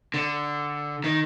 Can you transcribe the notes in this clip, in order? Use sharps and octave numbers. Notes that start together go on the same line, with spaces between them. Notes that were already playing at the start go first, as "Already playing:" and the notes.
D3
D#3